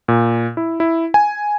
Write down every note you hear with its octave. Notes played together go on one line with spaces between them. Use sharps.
A#2
E4
E4
G#5